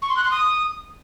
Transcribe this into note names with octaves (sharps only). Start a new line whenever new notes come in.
C#6
C6
F#6
C6
D#6